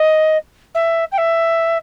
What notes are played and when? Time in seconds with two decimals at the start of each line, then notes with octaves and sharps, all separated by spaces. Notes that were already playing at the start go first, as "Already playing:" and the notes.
Already playing: D#5
0.75 E5
1.12 G5
1.18 E5